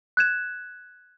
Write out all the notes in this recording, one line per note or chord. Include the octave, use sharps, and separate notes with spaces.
F#6 G#6 E7